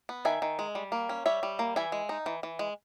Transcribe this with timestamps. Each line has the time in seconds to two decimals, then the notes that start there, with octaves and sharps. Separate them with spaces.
0.09 B3
0.25 D#3 E5 G#5
0.42 D#3
0.59 G#3
0.75 G3
0.92 A#3
1.09 C#4
1.26 G3 C#5 E5
1.43 G3
1.59 A#3
1.76 E3 E5 G#5
1.92 G#3
2.09 D#4
2.26 E3
2.43 E3
2.59 G#3